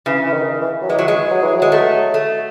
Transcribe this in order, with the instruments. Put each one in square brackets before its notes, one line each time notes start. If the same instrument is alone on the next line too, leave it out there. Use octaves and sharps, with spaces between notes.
[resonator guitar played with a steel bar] C#3 [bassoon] E3
[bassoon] E3
D#3
E3
F#3
[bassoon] E3 [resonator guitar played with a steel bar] G#3
[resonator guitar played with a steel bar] F#3
G#3
[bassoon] F#3
E3
F#3
[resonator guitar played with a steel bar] G#3
A3
A3